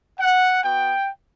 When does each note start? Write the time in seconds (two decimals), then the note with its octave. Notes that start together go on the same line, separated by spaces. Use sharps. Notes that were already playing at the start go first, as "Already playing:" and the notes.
0.20 F#5
0.63 B3 F#4 G5